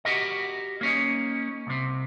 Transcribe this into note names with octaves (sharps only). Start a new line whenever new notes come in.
F#4 G4 A#4 D#5
A#3 C#4 D#4
C2 C3